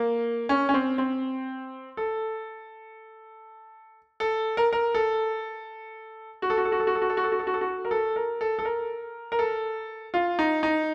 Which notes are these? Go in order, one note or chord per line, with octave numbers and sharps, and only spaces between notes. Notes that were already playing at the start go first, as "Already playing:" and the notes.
Already playing: A#3
C#4
C#4
C4
C4
A4
A4
A#4
A#4
A4
F#4
A4
F#4
A4
F#4
A4
F#4
A4
F#4
A4
F#4
A4
F#4
A4
F#4
A4
F#4
A#4
A4
A#4
A4
A4
A#4
A#4
A4
F4
D#4
D#4